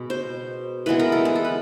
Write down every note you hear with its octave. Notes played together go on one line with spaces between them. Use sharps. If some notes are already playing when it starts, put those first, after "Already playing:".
Already playing: B2 G#3
C5
E3 G#3 B3 B4
A#4
A4
G#4
A4
B4